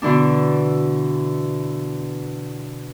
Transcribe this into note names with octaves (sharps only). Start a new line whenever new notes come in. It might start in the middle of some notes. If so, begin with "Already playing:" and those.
B2 D3 E3 D4